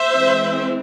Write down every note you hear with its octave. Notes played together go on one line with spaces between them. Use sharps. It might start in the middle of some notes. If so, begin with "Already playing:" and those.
Already playing: C5 E5
E3 G#3 C4